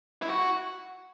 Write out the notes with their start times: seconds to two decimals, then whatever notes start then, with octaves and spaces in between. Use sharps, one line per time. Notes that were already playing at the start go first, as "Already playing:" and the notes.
0.22 E4
0.28 F#4